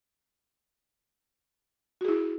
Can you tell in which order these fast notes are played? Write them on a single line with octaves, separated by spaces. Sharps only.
F#4 G#4 E4